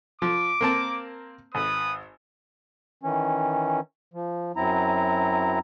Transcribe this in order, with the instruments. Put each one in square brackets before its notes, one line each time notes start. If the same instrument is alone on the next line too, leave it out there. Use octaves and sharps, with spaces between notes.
[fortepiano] F3 [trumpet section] D6
[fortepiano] A#3 C4 A5
[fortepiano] G#1 [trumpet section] B4 D#6
[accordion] D#3 E3 C#4
F3
F#2 F#3 C4 E4 A#5